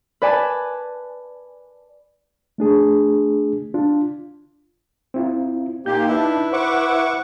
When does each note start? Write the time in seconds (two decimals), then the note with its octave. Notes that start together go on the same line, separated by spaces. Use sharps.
0.22 B4 D5 G#5 A5
2.58 A3 D4 G#4
3.74 D4 F4
5.14 C4 E4 F4
5.86 A#2 A#3 D#4 G4 G6
6.09 D4 E4 B4
6.53 C5 F#5 C#6 D6